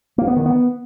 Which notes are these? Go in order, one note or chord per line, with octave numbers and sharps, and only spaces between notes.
A#3
B3
D#3
B3